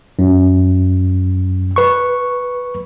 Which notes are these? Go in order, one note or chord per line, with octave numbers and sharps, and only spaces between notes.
F#2
B4 C#6